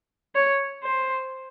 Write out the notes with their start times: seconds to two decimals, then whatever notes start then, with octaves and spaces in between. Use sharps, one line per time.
0.35 C#5
0.83 C5